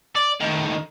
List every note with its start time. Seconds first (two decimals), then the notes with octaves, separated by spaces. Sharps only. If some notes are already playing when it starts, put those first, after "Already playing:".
0.15 D5
0.41 A2 D#3